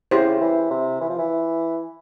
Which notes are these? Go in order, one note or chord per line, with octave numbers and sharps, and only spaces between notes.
C#3 E4 G4 C5
E3
C3
E3
F3
E3